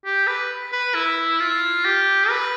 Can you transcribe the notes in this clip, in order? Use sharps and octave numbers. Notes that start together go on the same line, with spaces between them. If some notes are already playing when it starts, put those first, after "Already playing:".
G4
B4
B4
E4
F4
G4
B4